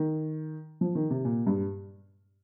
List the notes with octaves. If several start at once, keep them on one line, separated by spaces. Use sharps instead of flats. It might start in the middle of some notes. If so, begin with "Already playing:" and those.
Already playing: D#3
F3
D#3
C3
A#2
G2